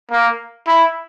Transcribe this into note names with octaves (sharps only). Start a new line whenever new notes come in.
A#3
E4